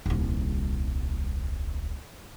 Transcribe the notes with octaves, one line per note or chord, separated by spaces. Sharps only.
D#1 C2